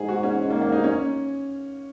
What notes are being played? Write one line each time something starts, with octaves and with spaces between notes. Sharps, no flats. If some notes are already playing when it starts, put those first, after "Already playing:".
Already playing: G#2 G#4
F#4
C#4
G#2
A#3
A#3
D#4
C#4